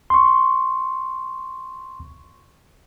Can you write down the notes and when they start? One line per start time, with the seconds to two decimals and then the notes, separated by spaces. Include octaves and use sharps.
0.10 C6 C#6